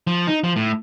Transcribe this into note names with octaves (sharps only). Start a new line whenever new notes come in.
F3
D#4
F3
A2